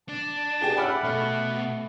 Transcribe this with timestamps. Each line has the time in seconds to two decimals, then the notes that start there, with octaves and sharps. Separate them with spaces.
0.09 D4 A5
0.61 G4 G#4 G5
0.77 C#4 E5 F#5 B5 D6 F6
1.04 B2 A3